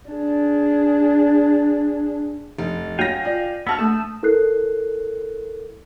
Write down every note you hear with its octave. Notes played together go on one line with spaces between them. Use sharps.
D4 G#4
F1
F#3 F5 G5 G#5 A#6
F4 D5
B3 F#4 A5 E6 F6
A3 A5 D#6
E4 A4 A#4 F#6 C7